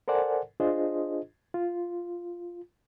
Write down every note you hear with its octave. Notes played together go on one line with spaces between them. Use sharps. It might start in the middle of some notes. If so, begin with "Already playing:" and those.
A4 A#4 C5 D5 F#5 G#5
D4 F4 G#4 C5 D#5
F4